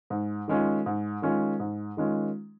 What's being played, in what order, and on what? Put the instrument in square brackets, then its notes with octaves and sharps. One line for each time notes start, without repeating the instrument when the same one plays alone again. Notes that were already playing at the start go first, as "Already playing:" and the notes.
[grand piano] G#2
D#3 G#3 C#4 F4
G#2
D#3 G#3 C#4 F4
G#2
D#3 G#3 C#4 F4